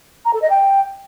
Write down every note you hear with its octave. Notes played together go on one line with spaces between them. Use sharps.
A#5
A4
D#5
G5